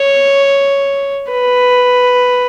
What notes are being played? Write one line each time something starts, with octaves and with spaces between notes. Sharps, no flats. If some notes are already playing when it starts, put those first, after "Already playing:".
Already playing: C#5
B4